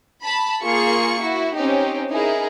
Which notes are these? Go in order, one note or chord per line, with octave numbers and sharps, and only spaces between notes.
A5 B5
A#3 F4 G#4 C#6 C#7
E4 F#4
C4 C#4 D#4 G4
D#4 E4 G#4 A#4